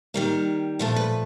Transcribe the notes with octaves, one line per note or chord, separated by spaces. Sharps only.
D#3 G3 A#3
A#2 F3 A3 A#4
B4